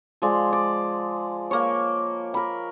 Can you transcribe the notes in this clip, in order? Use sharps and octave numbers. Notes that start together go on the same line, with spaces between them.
F3 G#3 D5
D5
A#3 C#5
A#4 B5